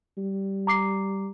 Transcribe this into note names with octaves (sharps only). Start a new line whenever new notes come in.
G3
A#5 D6 C7